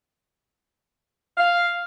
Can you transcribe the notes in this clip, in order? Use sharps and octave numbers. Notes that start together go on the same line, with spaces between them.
F5